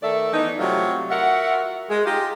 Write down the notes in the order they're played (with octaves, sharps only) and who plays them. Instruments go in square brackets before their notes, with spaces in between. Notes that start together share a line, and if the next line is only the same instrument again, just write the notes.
[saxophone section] D#3 A3 A4 D5 E5
E3 B3 D#4
C3 F#3 G3 A3 F4
F4 F#4 A#4 E5 F#5
G#3
D#4 F4 G4